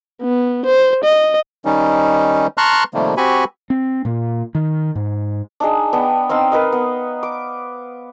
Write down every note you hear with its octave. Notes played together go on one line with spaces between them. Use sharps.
B3
C5
D#5
D#3 G3 C#4 D#4
A5 A#5 C6 C#6 F6 F#6
C3 D#3 F3 G3 A3 A#3
C4 F#4 G4 G#5 B5 C#6
C4
A#2 A#3
D#3
G#2
D4 D#4 G#4
B3 D4 G5
C4 D#4 F5 E6
A#4 B4 D#5
B3
D6